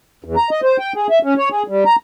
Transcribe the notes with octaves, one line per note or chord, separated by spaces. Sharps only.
E2
A#5
D#5
C5
G5
G#4
E5
C#4
C#5
G#4
G3
A#5